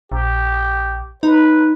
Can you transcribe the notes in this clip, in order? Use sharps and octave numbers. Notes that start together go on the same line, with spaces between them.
A#1 G4
D#4 B4